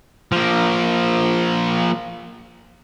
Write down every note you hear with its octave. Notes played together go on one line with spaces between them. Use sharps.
F3 A#3